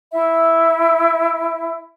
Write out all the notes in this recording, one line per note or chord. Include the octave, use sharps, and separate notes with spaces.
E4 E5